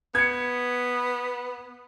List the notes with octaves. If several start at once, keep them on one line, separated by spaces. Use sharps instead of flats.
B3 G#6 C#7